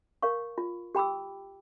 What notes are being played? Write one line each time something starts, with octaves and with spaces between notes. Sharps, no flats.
A#4 C#5 F5 C#6
F4
G4 G5 B5 D6 E6